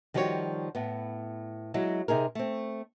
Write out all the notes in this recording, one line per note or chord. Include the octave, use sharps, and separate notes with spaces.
D#3 F3 G3 F#4 G#4 C#5
A2 B3
F#3 G#3 E4
C3 D#4 G#4 A#4
A3 C4